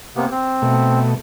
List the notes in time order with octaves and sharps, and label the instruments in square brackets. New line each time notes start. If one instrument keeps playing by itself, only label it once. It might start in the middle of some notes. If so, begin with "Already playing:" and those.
[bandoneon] C3 A#3 B3
C4
[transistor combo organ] B2 A3